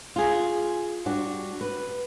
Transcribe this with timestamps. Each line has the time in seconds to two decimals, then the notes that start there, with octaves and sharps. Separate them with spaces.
0.16 F4 G#4
1.06 G3 D4 F#4
1.61 B4